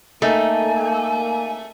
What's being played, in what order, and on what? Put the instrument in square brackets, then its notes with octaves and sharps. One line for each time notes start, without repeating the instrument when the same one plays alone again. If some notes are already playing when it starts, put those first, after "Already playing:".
[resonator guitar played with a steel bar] A3 [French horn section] A#3 [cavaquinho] D#4 [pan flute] G#5